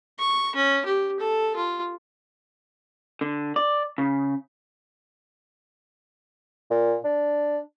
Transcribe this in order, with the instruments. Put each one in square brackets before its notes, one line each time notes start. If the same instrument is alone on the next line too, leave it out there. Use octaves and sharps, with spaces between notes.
[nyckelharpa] C#6
C#4
G4
A4
F4
[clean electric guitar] D3
D5
C#3
[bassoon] A#2
D4